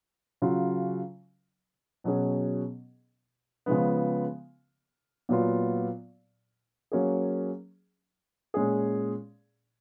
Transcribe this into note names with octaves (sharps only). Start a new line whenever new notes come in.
C#3 F#3 C#4 F4
B2 F#3 C#4 G#4
C#3 F3 G#3 B3
A#2 F#3 B3 F4
F#3 A#3 C#4 G#4
A#2 G#3 C#4 G#4